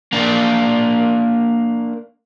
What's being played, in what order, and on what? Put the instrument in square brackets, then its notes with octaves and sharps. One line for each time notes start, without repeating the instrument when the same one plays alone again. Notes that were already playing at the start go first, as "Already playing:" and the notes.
[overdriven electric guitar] A#3 D4